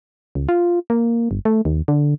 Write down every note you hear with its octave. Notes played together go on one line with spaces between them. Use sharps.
C#2
F4
A#3
G1
A3
D#2
D3